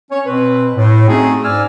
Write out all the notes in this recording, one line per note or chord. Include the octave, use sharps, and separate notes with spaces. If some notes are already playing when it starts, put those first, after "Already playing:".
C#4 C#5
B2 C4 B4
A2
A3 C4 C#4 D#4 F#4 G#4
G#2 C#4 D5 G#5 E6 F6